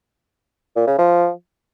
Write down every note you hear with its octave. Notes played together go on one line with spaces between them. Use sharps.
A#2
C#3
F3